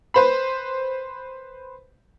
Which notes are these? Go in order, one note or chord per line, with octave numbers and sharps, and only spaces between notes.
B4 C5 B5